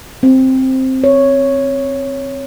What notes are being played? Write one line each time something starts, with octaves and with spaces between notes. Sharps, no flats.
C4
C#5